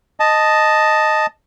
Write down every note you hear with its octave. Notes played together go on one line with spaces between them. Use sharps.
D#5 A5